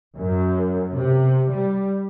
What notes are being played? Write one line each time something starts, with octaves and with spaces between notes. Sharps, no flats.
F#2
C3
G3